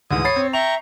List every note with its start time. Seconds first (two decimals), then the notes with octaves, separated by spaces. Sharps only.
0.11 D2 G#2 E3 D#6
0.25 C#5 B5 A6 C7
0.36 C4
0.53 E5 G5 A#5 C#6 F7